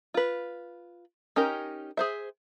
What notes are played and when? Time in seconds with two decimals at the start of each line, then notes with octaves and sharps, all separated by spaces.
0.14 F4 B4
1.36 C#4 D#4 G4 A#4
1.97 G#4 C5 E5